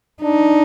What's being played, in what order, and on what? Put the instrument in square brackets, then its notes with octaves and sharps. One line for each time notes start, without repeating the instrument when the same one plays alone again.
[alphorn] D4 [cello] D#4